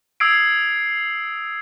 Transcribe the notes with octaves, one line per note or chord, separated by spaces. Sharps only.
D#6 E6 G#6 C7 D7